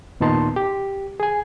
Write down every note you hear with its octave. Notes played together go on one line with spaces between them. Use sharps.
D#2 A#2 B3 D#4 A5 C6
G4
G#4 G#5